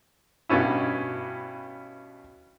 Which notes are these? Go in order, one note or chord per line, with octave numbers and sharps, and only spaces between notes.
G2 B2 C#4 E4